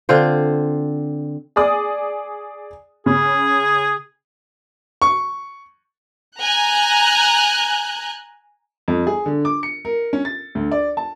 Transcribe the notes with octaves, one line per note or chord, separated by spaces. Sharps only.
D3 C4 F4 C5
G#4 D5 D#6
C#3 G#4
C#6
G#5 A#5 F#6 G6
F2
G#4
D3
D6
C#7
A#4
C#4
A6
D2
D5
A5